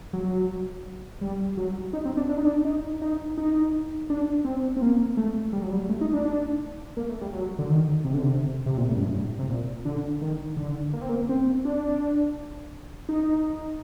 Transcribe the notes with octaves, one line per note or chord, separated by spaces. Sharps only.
F#3
G3
F#3
D#4
C4
D4
D4
D#4
D4
D#4
D#4
D#4
D4
C4
C4
A#3
A3
G3
F#3
G3
A3
D#4
D4
A#3
A3
G3
F#3
D3
D#3
C3
D3
C3
C3
A#2
A2
F#2
G2
A2
C3
A#2
D3
D#3
D3
A#3
C4
A#3
C4
D4
D#4